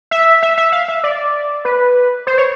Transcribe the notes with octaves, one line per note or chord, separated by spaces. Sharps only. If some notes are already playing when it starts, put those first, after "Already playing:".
E5
E5
E5
F5
E5
D5
B4
C5
C#5